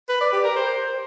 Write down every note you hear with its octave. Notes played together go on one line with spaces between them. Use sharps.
B4
D5
G4
A#4
C5